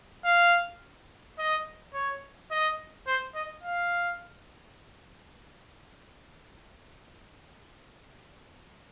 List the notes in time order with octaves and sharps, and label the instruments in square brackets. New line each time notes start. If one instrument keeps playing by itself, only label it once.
[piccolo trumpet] F5
D#5
C#5
D#5
C5
D#5
F5